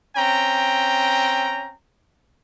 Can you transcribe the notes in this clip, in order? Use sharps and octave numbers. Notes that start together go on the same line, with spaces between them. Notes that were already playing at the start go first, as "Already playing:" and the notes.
C4 C#4 G5 A#5